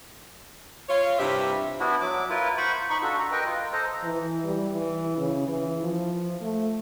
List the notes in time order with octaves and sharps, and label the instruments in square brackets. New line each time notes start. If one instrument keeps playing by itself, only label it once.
[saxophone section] F4 C#5
G2 C3 E4 G4 C5 E5
[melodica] B3 D4 E4 F#4
F#3 D6
E4 F4 A#4 B4
C5 F#5 B5 C#6
D#4 B5 C#6
D4 F4 F#4 A4
A#5
A#4 B4 D#5 G5
F4
A4 C5 D#5 A#5
[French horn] E3
G3
E3
C#3
E3
F3
A3